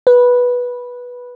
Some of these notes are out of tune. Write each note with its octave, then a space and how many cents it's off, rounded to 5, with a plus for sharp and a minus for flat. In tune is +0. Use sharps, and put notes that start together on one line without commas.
B4 -10